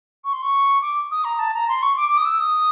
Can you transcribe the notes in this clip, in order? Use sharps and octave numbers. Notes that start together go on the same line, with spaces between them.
C#6
C6
C#6
D6
D#6
A#5
A5
A#5
C6
C#6
D6
D6
D#6
E6
D#6